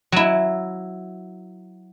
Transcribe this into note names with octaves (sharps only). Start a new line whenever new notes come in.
F#3 E4